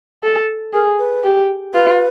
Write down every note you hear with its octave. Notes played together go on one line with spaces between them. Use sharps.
A4
G#4 A#4
B4
G4
F4 B4